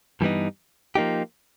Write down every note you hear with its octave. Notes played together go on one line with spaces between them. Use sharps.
G2 E3 G3 B3 D#4
F3 A#3 D#4 G4